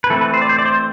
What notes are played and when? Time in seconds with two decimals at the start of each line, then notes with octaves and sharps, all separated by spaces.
0.04 B4
0.10 E3 A3 C4 A4
0.21 B4
0.34 C5
0.42 D5
0.49 C5
0.59 D5
0.65 C5